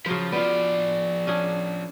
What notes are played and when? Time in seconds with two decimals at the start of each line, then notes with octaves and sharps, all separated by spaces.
0.06 C#3 F3 F#3 C5
0.32 F3 B3 F4 D5
1.27 C#4 D4 G#4